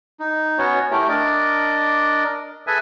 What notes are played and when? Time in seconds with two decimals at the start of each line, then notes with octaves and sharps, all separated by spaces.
0.20 D#4
0.58 B3 C#4 F#4 C#5
0.91 A3 E4 G4 A#4
1.09 D4 A#4 D5 D#5
2.67 G#4 A4 B4 E5 G#5